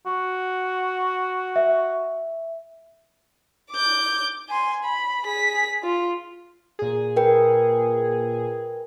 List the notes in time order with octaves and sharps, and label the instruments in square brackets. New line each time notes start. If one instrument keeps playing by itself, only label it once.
[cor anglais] F#4
[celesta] E5
[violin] D6 G6
G#5 C6
B5
G#4 B6
F4
[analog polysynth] A#2 G#4
[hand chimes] A#4 B4 G5